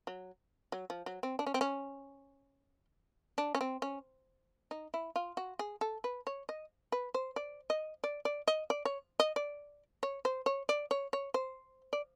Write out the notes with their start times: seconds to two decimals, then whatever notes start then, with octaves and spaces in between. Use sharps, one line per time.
0.07 F#3
0.72 F#3
0.90 F3
1.06 F#3
1.23 C4
1.39 D4
1.46 C#4
1.54 C4
1.61 C#4
3.38 D4
3.55 C#4
3.61 C4
3.82 C#4
4.71 D#4
4.94 E4
5.16 F4
5.37 F#4
5.59 G#4
5.81 A4
6.04 B4
6.27 C#5
6.49 D#5
6.92 B4
7.14 C5
7.36 D5
7.70 D#5
8.04 D5
8.25 D5
8.48 D#5
8.70 D5
8.85 C#5
9.20 D#5
9.36 D5
10.03 C#5
10.25 C5
10.46 C#5
10.69 D5
10.91 C#5
11.13 C#5
11.34 C5
11.93 D5